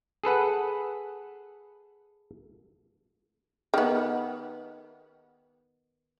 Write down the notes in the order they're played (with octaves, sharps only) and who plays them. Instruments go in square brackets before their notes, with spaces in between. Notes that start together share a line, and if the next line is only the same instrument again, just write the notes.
[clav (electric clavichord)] G#4 A4 B4 F#5
[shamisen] D#3 B3